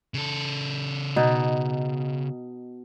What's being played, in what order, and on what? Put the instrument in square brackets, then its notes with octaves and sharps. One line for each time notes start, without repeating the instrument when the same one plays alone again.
[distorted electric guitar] C#3 A4
[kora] B2 D#4